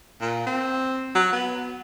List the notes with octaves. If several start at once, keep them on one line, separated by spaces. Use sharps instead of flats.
A#2
C4
F#3
B3